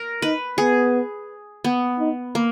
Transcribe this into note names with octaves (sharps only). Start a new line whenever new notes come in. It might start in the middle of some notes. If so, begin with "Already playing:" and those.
Already playing: A#4
D#4 B4
B3 G#4
B3
D#4
A#3